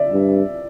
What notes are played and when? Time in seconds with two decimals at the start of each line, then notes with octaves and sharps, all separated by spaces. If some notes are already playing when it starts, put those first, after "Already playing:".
Already playing: D5 E5
0.12 G2